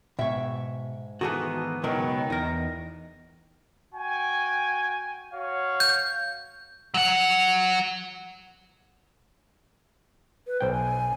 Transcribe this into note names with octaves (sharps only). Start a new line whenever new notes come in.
G#2 B2 C#5 E5 G5
D#3 E3 B3 F#4 G#4 A4
C#2 B2 D#3 F#3 B3 A#4
E2 D#4 A#4
F#4 G5 G#5
F#4 C#5 F5
G6
F#3 F#5
B4
B1 C5 G5
G#5